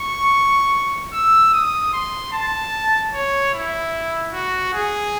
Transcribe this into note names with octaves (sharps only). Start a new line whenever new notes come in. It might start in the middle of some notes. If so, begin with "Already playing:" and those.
Already playing: C#6
E6
D#6
C6
A5
C#5
E4
F#4
G#4